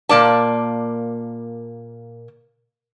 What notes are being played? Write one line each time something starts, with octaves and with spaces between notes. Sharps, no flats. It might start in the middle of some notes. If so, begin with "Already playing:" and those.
A#2 A#3 D5 A5